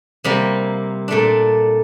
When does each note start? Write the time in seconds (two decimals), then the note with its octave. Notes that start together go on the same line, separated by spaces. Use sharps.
0.24 C3 G3 A#3
1.08 A#2 A3 D4